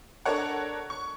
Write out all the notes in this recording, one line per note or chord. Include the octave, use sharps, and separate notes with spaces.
D4 A4 A#4 C#5 F#5
C#6